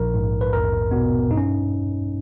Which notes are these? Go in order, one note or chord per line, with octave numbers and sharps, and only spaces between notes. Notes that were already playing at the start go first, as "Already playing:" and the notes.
Already playing: A#1 A#4
G#2
B4
E2 A#4
B2 B3
G2 D#4
C#4